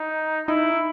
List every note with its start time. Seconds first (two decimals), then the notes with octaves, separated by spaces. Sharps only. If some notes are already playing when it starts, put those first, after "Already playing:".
Already playing: D#4
0.47 D#4 E4